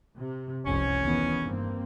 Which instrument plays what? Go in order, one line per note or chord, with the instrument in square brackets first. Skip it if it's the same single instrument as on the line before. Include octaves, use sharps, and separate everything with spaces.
[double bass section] C3
[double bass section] F1 C2 F2 [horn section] C#4
[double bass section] E2 D#3 B3
G2 A#3 C4